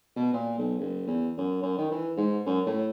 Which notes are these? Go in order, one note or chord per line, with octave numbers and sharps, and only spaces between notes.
B2
A#2
B1
F#1
E2
F#2
F#2
D#3
E3
G#2
F#2
A2